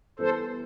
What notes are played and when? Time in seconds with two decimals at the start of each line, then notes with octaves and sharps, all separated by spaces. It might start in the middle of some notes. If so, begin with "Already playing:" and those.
0.19 E3 G3 B3 E4 A4 C5